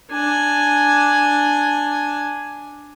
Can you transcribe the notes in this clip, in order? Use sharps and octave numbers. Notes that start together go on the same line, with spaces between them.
D4 G#5